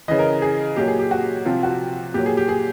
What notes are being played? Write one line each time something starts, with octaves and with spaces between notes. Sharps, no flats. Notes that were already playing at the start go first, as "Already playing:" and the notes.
C#3 E3 D#5
A#4
G#4
A#2 F#3 G4
G#4
G4
F#4
C3 F3 F4
F#4
A#2 F#3 G4
G#4
G4
G#4